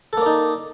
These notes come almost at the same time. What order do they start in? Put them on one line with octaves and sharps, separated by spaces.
A4 A#3 D5 D#4